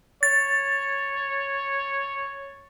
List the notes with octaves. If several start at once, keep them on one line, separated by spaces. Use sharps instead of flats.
C#5 A6